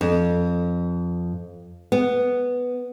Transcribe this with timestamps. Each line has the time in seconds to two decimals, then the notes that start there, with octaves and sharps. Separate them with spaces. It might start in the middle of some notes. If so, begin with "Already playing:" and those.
0.01 F2
1.92 B3